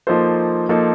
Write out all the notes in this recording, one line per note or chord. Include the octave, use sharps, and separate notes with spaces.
F3 A#3 D#4 A4 C5
F3 A#3 D#4 A4 C5